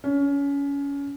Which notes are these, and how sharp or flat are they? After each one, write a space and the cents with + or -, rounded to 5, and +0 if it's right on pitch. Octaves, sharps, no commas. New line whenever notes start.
C#4 +25